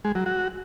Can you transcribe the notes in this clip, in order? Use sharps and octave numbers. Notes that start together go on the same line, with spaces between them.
G#3
F#3
F#4